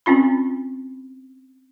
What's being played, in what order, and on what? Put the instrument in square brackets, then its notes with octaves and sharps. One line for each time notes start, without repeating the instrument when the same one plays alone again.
[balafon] C4 C#4 F4 B5